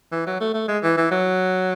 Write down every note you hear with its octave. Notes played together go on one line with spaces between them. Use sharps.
E3
F#3
A3
A3
G#3
E3
E3
F#3